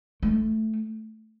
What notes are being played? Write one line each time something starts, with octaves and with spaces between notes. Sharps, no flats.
A3